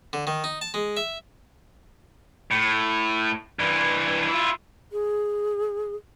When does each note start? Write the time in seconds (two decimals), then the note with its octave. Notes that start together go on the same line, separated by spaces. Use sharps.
0.13 D3
0.27 D#3
0.44 D#4
0.61 A5
0.74 G#3
0.97 E5
2.51 A2
3.59 G2 E3
4.29 E4 F4
4.92 G#4